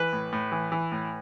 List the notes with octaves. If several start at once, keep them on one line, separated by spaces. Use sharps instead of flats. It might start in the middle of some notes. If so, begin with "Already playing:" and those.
Already playing: E3 B4
A2
A2
E3
E3
A2